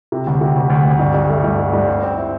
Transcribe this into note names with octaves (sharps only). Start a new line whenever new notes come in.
C3
D2
C3
D2
D2
D2
G2
G2
A3
G2
A3
G2
C4
C4
E4